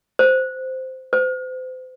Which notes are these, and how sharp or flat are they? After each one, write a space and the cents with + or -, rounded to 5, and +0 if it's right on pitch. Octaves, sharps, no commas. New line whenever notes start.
C5 -10
C5 -35